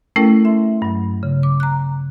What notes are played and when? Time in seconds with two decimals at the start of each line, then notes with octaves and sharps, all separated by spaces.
0.16 A3 C#4 E4 A4 A#4 G5
0.45 E5 C6
0.82 G2 F#3
1.23 C#3
1.43 D6
1.60 A#5 F#6